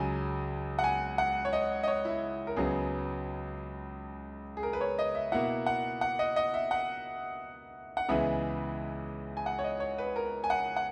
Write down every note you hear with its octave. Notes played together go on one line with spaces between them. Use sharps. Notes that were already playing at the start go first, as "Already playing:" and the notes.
Already playing: C#2 C#3 F#3 G#5
F#5
G#5
F#5
C#5
D#5
D#5
C#5
E4
A#4
C#2 C#3 F#3 B3 G#4
G#4
A#4
B4
C#5
D#5
E5
B2 A#3 E4 F#5
F#5
F#5
D#5
D#5
E5
F#5
F#5
C#2 C#3 E3 G#3 B3 E5
G#5
F#5
C#5
D#5
C#5
B4
A#4
G#5
F#5
F#5